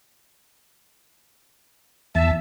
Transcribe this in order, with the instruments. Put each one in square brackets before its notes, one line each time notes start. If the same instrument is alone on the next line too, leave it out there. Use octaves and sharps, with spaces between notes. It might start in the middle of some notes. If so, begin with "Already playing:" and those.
[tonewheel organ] E2 A5 [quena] E5